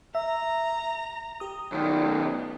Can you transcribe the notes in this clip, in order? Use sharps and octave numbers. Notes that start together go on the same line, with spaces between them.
E5 A#5
G4 D#6
B1 D#3
B3